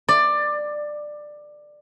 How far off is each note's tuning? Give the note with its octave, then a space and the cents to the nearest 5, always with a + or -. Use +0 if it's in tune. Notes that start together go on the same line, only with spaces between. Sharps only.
D5 +15